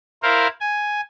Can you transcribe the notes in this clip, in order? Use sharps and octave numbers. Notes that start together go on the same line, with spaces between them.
E4 A#4 C5 F5
G#5